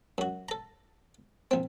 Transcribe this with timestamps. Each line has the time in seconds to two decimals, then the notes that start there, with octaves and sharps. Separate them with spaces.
0.18 F#2 F#4
0.49 A4 A#5
1.51 A#1 C4